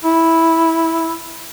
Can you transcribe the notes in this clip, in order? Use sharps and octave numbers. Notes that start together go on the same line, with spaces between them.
E4